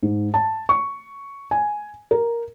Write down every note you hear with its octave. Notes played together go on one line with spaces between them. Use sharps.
G#2
A5
C#6
G#5
A#4